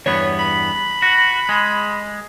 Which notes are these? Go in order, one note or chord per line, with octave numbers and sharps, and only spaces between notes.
E2 G2 B3 C#5
B5
F#4
G#3